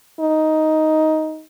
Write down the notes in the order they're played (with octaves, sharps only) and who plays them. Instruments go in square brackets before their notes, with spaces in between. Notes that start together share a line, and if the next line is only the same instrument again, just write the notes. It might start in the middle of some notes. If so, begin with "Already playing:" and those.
[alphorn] D#4